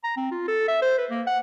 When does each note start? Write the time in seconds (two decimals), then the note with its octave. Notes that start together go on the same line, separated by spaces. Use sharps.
0.04 A#5
0.17 C4
0.32 F4
0.48 A4
0.68 E5
0.82 C5
0.98 B4
1.11 A#3
1.27 F#5